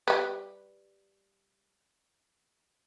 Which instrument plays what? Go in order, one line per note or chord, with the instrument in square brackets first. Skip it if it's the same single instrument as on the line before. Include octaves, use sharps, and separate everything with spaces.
[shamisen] G3 B4